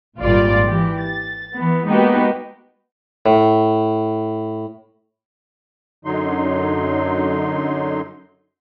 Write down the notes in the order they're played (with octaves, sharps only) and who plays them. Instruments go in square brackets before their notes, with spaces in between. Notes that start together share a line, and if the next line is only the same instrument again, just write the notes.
[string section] G#1 A#2 G3 F4 D5
E3 G4
A6
E3 B3
G#3 A#3 B3 D#4 F#4 G4
[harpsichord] A2
[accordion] F#2 D3 F#3 D#4 C6